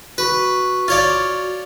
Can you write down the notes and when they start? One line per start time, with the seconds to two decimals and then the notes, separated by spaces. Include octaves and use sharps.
0.18 F#4 B4 C#6
0.88 F4 C#5 D5